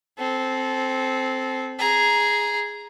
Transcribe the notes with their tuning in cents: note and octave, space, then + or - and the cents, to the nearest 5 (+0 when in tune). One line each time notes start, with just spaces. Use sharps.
C4 +0 A4 -25
G#4 +0 A#5 +10